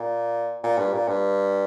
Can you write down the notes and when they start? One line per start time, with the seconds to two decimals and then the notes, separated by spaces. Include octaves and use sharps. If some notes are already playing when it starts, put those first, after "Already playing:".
Already playing: A#2
0.64 A#2
0.78 G2
0.93 A#2
1.08 G2